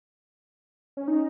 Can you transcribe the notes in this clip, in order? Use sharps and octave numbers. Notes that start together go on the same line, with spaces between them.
C#4
D#4